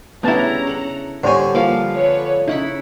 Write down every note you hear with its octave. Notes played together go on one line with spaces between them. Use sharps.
C#3 G3 A3 B3 D4 E4 A5 A#5
A4 F#5
D3 G3 C5 C#5 G#5
F3 A#3 D5 F5
A4 B4 C#5
C#3 D#4 E4 F#5 B5